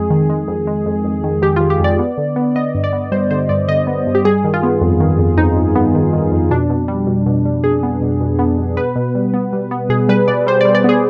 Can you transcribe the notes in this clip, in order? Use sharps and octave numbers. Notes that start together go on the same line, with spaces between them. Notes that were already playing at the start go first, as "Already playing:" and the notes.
Already playing: F2 G#3 G#4
D#3
G#3
F2
G#3
F2
F2
D#3
D#3 G4
D#3 F4
G4
F2 D5
B3
D3
B3
B3 D#5
G2
D5
B3
G3 C5
D3 C5
G2 D5
D3 D#5
B3
G2
G4
G3 G#4
D#3
F4
B3
F2
D#3
F2
F2 D#4
F2
B3
D#3
D#3
F2
B2 D4
B2
G3
B2
B2
G3
B2 G#4
B3
B2
B2
B3
B2
B3 B4
B2
G3
B3
G3
B3
B2 G#4
G3 B4
B2 D5
G3 C5
G3 D5
D5
B3 G#4